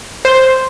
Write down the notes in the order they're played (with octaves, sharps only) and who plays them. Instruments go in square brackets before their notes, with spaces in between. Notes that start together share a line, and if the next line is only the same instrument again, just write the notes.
[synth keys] C5